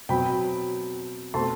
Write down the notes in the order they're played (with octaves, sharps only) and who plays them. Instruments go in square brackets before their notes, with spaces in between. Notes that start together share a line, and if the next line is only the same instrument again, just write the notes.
[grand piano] B2 F#3 C4 G5 B5
B2 A3 C4 A5 C6